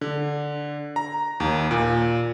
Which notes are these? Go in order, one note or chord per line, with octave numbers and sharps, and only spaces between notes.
D3
A#5
D#2
A#2